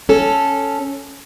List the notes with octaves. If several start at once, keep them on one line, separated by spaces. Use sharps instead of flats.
C#4 A4